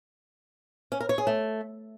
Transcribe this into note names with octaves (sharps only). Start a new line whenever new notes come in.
C#4
A#4
C#5
G#4
A3